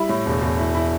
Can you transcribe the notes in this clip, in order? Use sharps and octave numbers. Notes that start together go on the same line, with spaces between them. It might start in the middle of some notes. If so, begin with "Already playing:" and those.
Already playing: G3 E4
A2
E1
E1
E4
E4